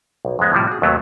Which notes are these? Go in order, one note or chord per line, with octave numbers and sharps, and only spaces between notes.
B1
F2 G#2 G#3 B3
A2 C3 F3 G3
F#4 G#4
D#2 C3 F#3 A3 B3